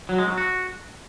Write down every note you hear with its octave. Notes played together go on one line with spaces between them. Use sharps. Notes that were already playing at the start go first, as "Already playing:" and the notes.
F#3
G#3
F#3
F#4